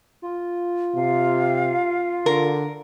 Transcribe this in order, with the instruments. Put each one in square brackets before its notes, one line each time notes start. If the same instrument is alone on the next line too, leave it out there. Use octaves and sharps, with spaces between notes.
[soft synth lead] F4
[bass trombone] C3 [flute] F5
[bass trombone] D3 [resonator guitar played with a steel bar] A#4